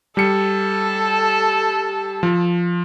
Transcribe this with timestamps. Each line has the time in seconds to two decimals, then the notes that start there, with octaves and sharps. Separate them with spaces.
0.17 G3 A4 C#7
2.23 F3